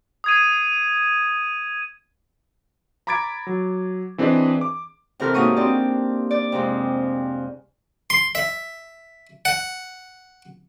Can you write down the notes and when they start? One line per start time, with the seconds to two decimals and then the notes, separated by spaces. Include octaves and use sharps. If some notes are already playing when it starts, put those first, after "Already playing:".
0.24 D#6 G#6 D#7
3.07 A#5 B5 D6 G#6 A6 D7
3.47 F#3
4.18 E3 C4 D4 G#4 B4 D#5
4.61 D6
5.20 C3 E3 C4 A4 A#4 F6
5.34 G#2 F#3 A#3 D#4 C#6 D#6
5.56 C4 D4 G4 D5
6.31 D5
6.52 F2 C3 G#3
8.10 C6
8.35 E5
9.45 F#5